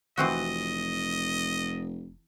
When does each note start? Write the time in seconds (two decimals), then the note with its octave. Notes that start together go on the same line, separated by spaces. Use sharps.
0.18 F1 E3 C4 F#4 D#5